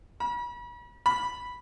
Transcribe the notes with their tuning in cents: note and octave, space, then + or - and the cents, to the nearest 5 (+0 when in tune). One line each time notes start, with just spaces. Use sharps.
B5 -40
B5 -5